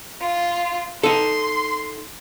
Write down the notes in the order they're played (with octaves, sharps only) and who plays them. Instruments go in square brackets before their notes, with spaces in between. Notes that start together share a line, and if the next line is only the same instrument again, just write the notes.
[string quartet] F4
[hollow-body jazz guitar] D#4 A4 [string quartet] C6